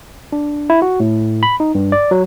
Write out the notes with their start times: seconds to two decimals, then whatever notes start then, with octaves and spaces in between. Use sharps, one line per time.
0.32 D4
0.70 E4
0.82 F#4
1.00 A2
1.43 B5
1.60 D#4
1.75 G2
1.92 D5
2.11 F#3